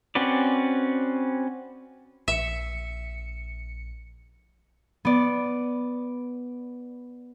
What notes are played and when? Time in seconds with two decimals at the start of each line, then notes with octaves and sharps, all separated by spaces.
0.15 C4 C#4 F#4 B4 D5
2.28 A#1 E5 C#7
5.05 B3 D5